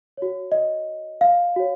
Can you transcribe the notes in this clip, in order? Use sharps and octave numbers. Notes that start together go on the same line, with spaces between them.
F#4 C#5
D#5
F5
F#4 C#5